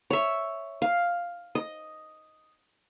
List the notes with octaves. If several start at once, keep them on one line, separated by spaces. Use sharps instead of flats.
C#5 E5
F5
D#5